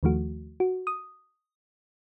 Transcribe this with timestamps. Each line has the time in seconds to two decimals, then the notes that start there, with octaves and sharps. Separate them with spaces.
0.03 D#2 D#3 F3 A3 F#4
0.60 F#4
0.87 D#6